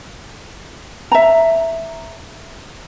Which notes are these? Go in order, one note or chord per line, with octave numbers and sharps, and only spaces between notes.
E5 A#5